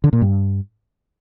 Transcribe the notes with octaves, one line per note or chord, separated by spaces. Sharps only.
D3
A#2
G2